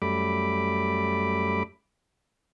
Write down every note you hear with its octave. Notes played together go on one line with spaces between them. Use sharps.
F#2 G3 A3 B5 D6